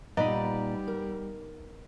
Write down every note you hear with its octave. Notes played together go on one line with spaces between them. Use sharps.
A#2 G3 B3 D#4 D5 D#5 A#5 B5
A#4